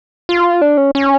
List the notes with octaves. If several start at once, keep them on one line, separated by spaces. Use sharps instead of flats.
F4
D4
C#4
C#4